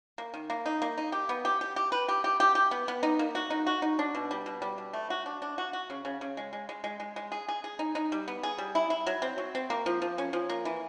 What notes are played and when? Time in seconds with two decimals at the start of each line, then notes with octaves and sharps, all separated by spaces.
0.18 A#3
0.34 D#3
0.50 A#3
0.66 D#4
0.82 A#3
0.98 D#4
1.12 G4
1.29 B3
1.45 G4
1.61 G4
1.76 G4
1.92 B4
2.09 G4
2.24 G4
2.40 G4
2.55 G4
2.71 B3
2.88 B3
3.03 D#4
3.19 A#3
3.35 F#4
3.50 D#4
3.67 F#4
3.82 D#4
3.99 D4
4.15 B2
4.31 G3
4.46 B2
4.62 G3
4.78 B2
4.93 A3
5.10 F#4
5.26 D4
5.42 D4
5.58 F#4
5.73 F#4
5.90 C#3
6.05 C#3
6.21 C#3
6.37 G#3
6.53 G#3
6.69 G#3
6.84 G#3
7.00 G#3
7.16 G#3
7.32 G#4
7.48 G#4
7.64 G#4
7.79 D#4
7.95 D#4
8.12 G3
8.28 B3
8.43 G#4
8.58 G3
8.75 E4
8.90 E4
9.06 F#3
9.22 C4
9.38 F#3
9.55 C4
9.70 A#3
9.86 F3
10.02 F3
10.18 C#4
10.33 F3
10.50 A#3
10.65 E3